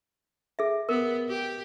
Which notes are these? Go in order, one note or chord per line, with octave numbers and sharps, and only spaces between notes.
G#4 E5
B3 A#4
G4